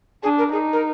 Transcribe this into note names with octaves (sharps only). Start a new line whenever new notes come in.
D4 G#4
A#4
D#4 G#4
A#4